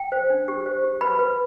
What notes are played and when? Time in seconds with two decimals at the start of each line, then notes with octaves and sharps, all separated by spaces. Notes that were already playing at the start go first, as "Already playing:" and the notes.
Already playing: G5
0.12 C5
0.30 D4
0.48 G4
0.66 C5
0.84 G4
1.01 B4 B5
1.19 B4